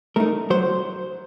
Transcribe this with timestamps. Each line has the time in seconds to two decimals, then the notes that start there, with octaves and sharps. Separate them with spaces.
0.16 A3 D#4 A#4
0.50 F#3 C5